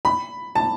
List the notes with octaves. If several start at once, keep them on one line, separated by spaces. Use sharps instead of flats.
B5
A5